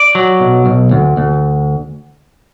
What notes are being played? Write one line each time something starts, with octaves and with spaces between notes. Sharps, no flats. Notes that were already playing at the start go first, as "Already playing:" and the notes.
Already playing: D5
F#3
B1
B1
D2
D2